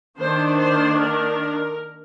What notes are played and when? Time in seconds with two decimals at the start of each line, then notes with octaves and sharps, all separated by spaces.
0.18 D#3 A#3 D4 C5
0.59 C5
1.00 A#4